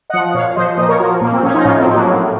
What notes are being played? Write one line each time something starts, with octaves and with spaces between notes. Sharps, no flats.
D#5 F#5
F3
A#2 C#5 F5
F3 C5 D#5
A#2 C5 D#5
A#4 C#5
F3 F#4 A#4
A#2 A#3
C4
F3 C#4
D#4
A2 C#4 F4
C4 D#4
F3
F#3 A#3
A2